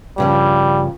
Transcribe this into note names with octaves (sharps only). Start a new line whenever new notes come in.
G2 C#3 F3 G3